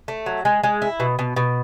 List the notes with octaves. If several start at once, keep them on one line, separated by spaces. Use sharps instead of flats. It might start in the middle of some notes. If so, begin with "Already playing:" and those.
A3
F#3
G#3
G#3
E4
B2
B2
B2